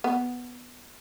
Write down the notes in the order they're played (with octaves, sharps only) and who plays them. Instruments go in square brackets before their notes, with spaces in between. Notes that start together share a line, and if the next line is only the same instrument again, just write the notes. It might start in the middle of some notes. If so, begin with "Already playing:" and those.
[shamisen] B3